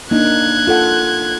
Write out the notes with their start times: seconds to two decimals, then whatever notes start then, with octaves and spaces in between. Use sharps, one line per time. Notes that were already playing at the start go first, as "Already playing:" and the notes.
0.11 A#3 D4 D#4 F#6 G#6
0.67 F4 A4 F#5